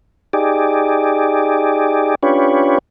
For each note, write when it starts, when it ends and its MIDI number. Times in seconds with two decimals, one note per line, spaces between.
0.33 2.15 63
0.33 2.15 67
0.33 2.15 68
0.33 2.15 74
2.23 2.78 61
2.23 2.78 62
2.23 2.78 65
2.23 2.78 67
2.23 2.78 71
2.23 2.78 73